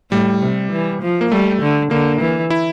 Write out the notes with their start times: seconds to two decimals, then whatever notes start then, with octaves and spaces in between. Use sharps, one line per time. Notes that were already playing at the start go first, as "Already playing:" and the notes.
0.11 A2 G3
0.42 C3
0.72 E3
1.02 F3
1.21 A#3
1.31 G3 A3
1.62 D3
1.91 D3 A#3
2.21 E3
2.50 E4